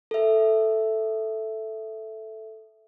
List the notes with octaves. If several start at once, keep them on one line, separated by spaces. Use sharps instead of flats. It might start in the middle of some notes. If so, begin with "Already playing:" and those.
A4 E5